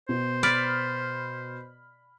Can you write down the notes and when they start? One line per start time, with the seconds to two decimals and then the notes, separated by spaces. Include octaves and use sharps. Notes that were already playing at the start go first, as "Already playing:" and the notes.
0.09 B2 C5
0.43 D5 B5 F6 B6